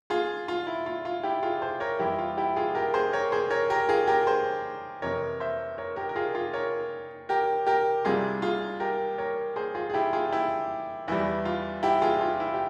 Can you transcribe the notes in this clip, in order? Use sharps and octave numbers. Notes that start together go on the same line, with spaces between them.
F4 G#4
F4
E4
F4
F4
E4 G4
F4 G#4
G#4 C5
A#4 C#5
F2 E3 G3 E4 G4
F4
E4 G4
F4 G#4
G4 A#4
G#4 C5
A#4 C#5
G#4 C5
A#4 C#5
G4 A#4
F4 G#4
G4 A#4
G#4 C5
F2 C3 E3 A#4 C#5
C5 E5
A#4 C#5
G4 A#4
A#4
F4 G#4
F4 G#4
A#4 C#5
G4 A#4
G4 A#4
C2 C3 G3 C4 F4 G#4
F4 G#4
G4 A#4
A#4 C#5
G#4 C5
F4 G#4
G#4
E4 G4
F4 G#4
E4 G4
E2 E3 G3 E4
F4
E4 G4
F4 G#4
F4
E4
G4